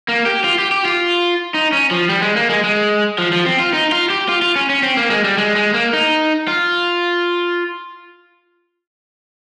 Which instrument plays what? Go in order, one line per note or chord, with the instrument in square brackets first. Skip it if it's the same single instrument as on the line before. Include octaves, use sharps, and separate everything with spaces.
[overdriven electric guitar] A#3
G4
F4
G4
G4
F4
D#4
C#4
F3
G3
G#3
A#3
G#3
G#3
F3
F3
C4
F4
D#4
F4
G4
F4
F4
C#4
C#4
C4
A#3
G#3
G3
G#3
G#3
A#3
D#4
F4